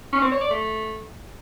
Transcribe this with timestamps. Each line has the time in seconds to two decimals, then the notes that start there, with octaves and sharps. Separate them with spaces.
0.12 C#4
0.22 C4
0.31 C#5
0.41 D5
0.51 A3